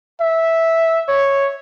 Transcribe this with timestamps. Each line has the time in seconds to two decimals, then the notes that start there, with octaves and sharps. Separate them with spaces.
0.21 E5
1.09 C#5